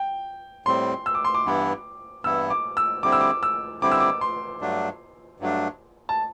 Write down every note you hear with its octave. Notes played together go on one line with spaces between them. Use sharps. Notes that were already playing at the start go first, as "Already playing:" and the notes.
Already playing: G5
A2 G3 C4 C6
E6
D6
C6
D6
G2 E3 B3 E4
G2 E3 B3 E4 E6
D6
E6
D3 G3 C4 E4 D6
E6
D6
E6
D3 G3 C4 E4 D6
E6
D6
C6
G2 F#3 A3 D4
G2 F#3 A3 D4
A5